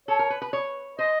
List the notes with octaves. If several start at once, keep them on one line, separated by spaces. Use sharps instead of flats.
A4 C#5
A#4
B4
B4
C#5
C5 D#5